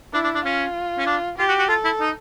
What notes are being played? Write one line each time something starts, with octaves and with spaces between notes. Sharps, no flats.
D4 E4
D4
D4
C#4 F4
C#4
D4
F4 G4
F#4
F#4
F4 A4
E4
D#4